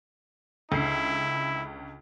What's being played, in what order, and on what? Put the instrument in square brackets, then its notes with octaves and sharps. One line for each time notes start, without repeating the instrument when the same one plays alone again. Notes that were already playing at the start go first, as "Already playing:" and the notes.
[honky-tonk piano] C#2 D3 C7 [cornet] E4